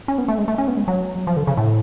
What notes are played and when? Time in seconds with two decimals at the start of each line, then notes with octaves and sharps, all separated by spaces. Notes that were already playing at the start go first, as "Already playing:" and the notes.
0.08 C#4
0.18 B3
0.28 A3
0.38 G#3
0.48 A3
0.58 C#4
0.68 B3
0.77 G#3
0.88 F#3
1.27 F3
1.37 D3
1.47 C#3
1.57 A2